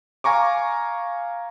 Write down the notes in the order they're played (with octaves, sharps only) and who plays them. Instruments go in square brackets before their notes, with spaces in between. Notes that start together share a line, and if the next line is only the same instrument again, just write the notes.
[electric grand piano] F5 G#5 A#5 C#6 D6